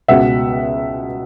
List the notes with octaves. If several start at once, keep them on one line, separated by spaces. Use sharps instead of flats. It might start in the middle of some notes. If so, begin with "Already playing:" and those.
C#2 B2 E5 F#5